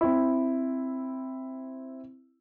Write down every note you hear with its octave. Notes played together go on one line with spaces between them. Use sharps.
C4 E4